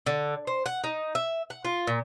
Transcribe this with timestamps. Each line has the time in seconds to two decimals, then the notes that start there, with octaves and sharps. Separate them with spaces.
0.06 D3
0.47 C5
0.66 F#5
0.84 D#4
1.15 E5
1.50 F#5
1.64 F4
1.87 A#2